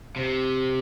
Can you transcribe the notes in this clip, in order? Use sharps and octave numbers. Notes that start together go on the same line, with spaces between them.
C3